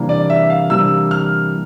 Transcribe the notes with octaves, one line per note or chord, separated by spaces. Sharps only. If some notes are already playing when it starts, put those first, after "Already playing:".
Already playing: C3 E3 G3 A#3 D4
D5
E5
F5
C3 E3 G3 A#3 D4 E6
F6